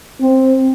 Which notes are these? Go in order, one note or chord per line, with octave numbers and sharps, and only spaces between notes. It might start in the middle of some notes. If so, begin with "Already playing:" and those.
C4